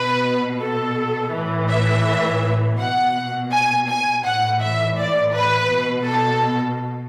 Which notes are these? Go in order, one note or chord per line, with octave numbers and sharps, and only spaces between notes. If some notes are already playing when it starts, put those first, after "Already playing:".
Already playing: B2 B4
A4
A2 E3
E5
B2 F#5
G#5
G#5
A2 E3 F#5
E5
D5
B4
B2
A4